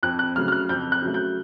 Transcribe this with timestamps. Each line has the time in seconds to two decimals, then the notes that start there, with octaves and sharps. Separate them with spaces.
0.03 F2 F#6
0.19 F#6
0.36 C#3 F#3 A3 F6
0.48 F6
0.52 F#6
0.69 F2 G6
0.92 F#6
1.02 C#3 F#3 A3
1.14 G6